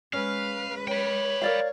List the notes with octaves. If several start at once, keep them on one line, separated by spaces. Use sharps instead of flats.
G#3 C#4 B4 F5
C#5 G5 B5
A#4 D5 F5